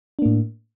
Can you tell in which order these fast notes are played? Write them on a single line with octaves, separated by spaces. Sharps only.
D4 A#3 A2